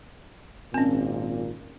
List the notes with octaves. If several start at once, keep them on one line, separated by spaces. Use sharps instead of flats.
G#1 A#2 C4 C#4